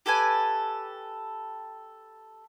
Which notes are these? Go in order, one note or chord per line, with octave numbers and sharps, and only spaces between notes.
G4 A4 B4 G#5